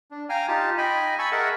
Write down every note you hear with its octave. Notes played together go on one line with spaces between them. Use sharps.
D4
F5 G5 G#5 A#5 F6
D#4 F4 G4 A5
D#5 G5 G#5 B5
G#5 A5 B5 C#6 E6
G#4 A#4 D#5 E5 F#5 A5